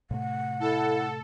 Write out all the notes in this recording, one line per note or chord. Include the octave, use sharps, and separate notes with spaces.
A2 C3 A3 F#5
E4 A4